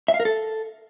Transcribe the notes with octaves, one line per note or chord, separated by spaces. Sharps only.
E5
F5
A#4
A4